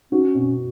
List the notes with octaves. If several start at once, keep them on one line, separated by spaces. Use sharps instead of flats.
C#4 F#4
B2